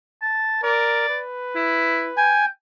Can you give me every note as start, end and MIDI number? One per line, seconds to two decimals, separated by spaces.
0.22 0.60 81
0.63 1.08 70
0.63 1.19 74
1.09 2.43 71
1.55 2.10 64
2.17 2.47 79
2.17 2.45 80